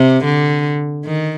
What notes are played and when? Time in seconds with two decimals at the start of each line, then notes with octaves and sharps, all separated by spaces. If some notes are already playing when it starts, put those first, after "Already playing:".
Already playing: C3
0.24 D3
1.06 D#3